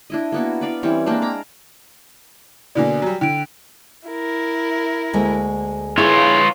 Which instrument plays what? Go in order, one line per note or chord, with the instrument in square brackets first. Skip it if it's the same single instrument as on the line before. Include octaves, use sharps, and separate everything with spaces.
[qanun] D4 E4 D#5
A#3 B3 F#4
B4 D5 F5
E3 G3 C4 C#4
G#3 A#3 C4 D4
F5 A#5 B5
[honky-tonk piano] B2 D3 A#3 [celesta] D5 G#5
[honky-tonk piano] F#3 G3
[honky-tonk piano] D3 [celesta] G5 D7
[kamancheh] E4 A#4
[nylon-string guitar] D2 G#3 A#3
[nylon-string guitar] E4 G#4 [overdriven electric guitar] F4 C#5 [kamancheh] B4